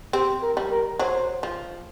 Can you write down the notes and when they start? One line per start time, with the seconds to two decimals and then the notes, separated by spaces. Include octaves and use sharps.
0.13 C4 G4
0.42 A#4
0.57 G3
0.71 A#4
0.99 F#3 C5
1.43 F3